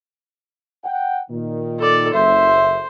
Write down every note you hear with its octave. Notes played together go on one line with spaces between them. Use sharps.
F#5 G5
A#2 D#3
A4 D5
F#1 C5 E5